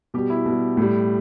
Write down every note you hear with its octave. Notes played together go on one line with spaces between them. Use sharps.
B2 G3 G4
E4
B2 G3
A2 G3